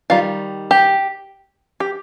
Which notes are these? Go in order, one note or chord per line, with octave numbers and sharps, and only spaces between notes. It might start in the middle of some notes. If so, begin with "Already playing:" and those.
D#3 G3 D#4 F4
G4
G4